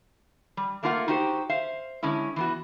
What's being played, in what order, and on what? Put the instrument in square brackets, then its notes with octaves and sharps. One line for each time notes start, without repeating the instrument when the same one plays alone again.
[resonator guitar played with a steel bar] G3
A3 A#3 D4 F4 A#4 F#5
D#4 F#4 G4 C5
C5 E5 F5
D3 G#3 C#4 E4
E3 B3 F#4